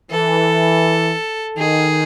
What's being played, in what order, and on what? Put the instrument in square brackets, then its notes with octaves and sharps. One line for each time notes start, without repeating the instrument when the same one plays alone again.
[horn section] E3 [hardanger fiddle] A4
[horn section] D#3 [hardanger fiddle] G#4